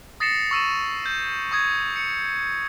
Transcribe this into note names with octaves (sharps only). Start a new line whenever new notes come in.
D#6 A6 A#6 C7 C#7 E7
C#6 E6 D#7 E7
G6
C#6 D#6 G#6
C#7